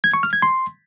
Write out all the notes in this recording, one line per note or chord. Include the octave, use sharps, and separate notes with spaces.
G#6
C#6
F6
G#6
C6